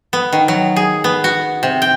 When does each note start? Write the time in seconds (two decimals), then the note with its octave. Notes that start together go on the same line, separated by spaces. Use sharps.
0.13 B3
0.33 D#3
0.48 F#3
0.76 G#4
1.04 B3
1.24 F#4
1.63 C3
1.82 G5